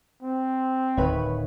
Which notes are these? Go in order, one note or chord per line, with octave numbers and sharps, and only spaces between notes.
C4
D1 D#3 B4 C#5